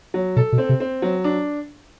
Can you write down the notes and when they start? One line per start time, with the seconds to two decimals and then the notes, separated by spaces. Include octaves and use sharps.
0.14 F#3
0.36 B2 A4
0.52 B2
0.58 C4
0.69 C3
0.80 C4
1.02 F#3
1.24 D4